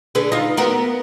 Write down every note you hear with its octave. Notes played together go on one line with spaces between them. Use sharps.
D3 G#4 B4
D#4 F4
B3 F#4 A#4